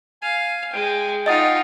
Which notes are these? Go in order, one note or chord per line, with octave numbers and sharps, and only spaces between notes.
F5 G#5
G#3 G5
D#4 F4 D#5 F#5 D#6 A6